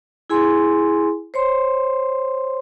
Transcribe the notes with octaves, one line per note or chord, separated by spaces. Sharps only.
E4 G#4 G#5 C6
C5 C#5 C6